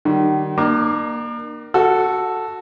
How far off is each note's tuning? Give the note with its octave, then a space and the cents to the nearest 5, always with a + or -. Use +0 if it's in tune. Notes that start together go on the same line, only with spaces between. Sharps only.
D#3 -35 G3 -40
A#3 +15 D4 +45 D6 +5
F#4 +0 A4 +0